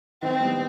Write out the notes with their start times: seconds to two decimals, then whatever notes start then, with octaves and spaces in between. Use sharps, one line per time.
0.22 D#3 C4
0.41 G3 B3